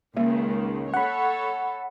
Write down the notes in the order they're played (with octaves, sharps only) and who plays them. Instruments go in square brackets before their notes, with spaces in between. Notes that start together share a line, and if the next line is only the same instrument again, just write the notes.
[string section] C#2 D#3 [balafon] A#3
[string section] A4 C#5 [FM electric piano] F#5 B5